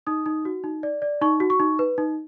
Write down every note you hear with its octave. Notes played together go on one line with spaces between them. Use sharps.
D#4 D#6
D#4
F#4
D#4
D5
D5
D#4 C#6
F#4
C#6
D#4
B4
D#4